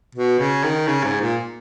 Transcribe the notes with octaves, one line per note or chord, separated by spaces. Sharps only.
B2
C#3
D#3
C#3
G#2
A#2